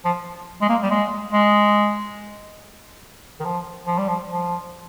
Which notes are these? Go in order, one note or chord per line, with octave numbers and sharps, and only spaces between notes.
F3
G#3
A#3
G3
G#3
G#3
D#3
F3
F3
G3
F3
F3